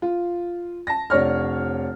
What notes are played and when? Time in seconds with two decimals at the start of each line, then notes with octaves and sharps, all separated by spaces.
0.02 F4
0.87 A5 A#6
1.10 F1 D4 C#5 F6